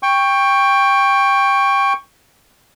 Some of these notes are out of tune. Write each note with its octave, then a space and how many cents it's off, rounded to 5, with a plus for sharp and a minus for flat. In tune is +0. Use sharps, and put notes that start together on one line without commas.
G5 +15 C#6 +0